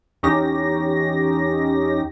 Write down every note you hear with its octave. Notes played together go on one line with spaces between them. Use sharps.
E2 C#4 D#4 G4 A#6